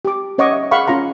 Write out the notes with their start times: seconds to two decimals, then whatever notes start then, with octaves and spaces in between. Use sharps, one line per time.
0.05 G4 D6
0.38 C#4 C#5 D#5 F#5 C#6 D6
0.52 E5
0.71 G#4 F5 F#5 B5 C#6
0.87 C#4 F4 F5 A#5 C6